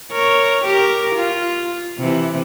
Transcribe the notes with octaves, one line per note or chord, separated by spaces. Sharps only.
A#4 C#5
G4 A#4
F4
C3 E3